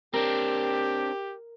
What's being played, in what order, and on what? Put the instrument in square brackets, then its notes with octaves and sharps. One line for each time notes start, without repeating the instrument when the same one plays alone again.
[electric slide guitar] C4 D4 [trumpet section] G4 [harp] A#4